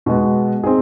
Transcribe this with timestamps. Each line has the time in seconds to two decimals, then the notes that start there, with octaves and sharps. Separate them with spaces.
0.06 B2 G#3 B3
0.64 C4 D#4 G#4